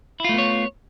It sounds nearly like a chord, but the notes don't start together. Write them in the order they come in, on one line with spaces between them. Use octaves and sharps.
E4 F4 A3 B3 C#5